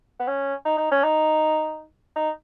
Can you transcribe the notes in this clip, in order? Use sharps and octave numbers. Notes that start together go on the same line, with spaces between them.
B3
C#4
D#4
D#4
C#4
D#4
D#4